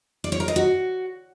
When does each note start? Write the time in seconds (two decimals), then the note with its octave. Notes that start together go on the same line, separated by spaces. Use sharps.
0.24 D5
0.32 C#5
0.40 A#4
0.48 D#5
0.56 F#4